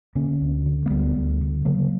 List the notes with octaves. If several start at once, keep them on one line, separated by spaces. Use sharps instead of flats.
D3 A#3 C#4
D2
D3
A#3
D2 G3 B3
D2
D3
C#3 F#3 A#3